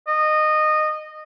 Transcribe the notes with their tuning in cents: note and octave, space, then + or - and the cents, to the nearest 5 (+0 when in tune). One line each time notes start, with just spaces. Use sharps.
D#5 -20